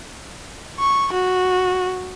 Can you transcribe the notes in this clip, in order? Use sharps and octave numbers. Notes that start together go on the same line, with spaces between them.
C#6
F#4